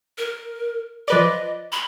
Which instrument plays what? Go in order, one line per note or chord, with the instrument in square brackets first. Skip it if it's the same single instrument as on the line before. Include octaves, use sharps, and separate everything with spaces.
[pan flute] A#4
[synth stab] F3 B4 D5 [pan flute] D#5
[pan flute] B5